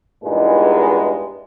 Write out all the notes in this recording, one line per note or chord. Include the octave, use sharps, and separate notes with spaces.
E2 G2 A#2 E3 G#3 D#4